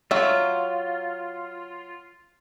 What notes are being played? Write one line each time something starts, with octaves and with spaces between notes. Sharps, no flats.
F#3 F4 E5